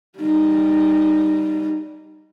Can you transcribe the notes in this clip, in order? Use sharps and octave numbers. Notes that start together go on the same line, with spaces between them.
G3 D#4